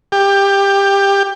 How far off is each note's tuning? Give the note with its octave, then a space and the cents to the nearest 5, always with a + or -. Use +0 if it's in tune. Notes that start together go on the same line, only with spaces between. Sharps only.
G4 +15